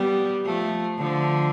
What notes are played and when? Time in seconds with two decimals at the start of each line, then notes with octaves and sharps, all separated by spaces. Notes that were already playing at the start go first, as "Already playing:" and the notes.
Already playing: G3 B3
0.45 F3 A3
0.98 D3 F3